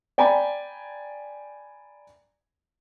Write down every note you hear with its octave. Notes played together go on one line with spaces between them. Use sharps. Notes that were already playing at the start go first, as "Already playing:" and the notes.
D5 G5 G#5 A#5 B5